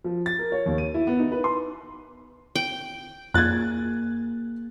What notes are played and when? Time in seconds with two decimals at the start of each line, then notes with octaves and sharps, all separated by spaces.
0.04 F3
0.26 A6
0.39 A#4
0.52 C#5
0.66 D#2
0.78 D#7
0.94 E4
1.07 B3
1.20 D#4
1.32 B4
1.44 C6
2.55 G5
3.34 F2 A#3 G#4 F#6 G#6 A6